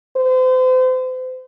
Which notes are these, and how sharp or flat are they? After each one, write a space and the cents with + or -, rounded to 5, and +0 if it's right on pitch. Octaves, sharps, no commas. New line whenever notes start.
C5 -35